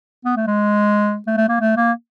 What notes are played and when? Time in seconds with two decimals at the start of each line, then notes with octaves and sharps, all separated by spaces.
0.25 B3
0.36 A3
0.47 G#3
1.27 A3
1.37 A3
1.49 A#3
1.61 A3
1.77 A#3